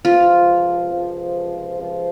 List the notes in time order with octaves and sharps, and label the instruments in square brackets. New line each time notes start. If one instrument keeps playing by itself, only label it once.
[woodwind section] C#2 C3 F3 [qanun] F4
[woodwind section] C#2 C3 F3
C#2 C3 F3